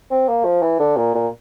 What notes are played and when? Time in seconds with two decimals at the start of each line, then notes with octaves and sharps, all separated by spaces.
0.10 C4
0.28 A#3
0.44 F3
0.62 E3
0.79 D3
0.96 A#2
1.14 A#2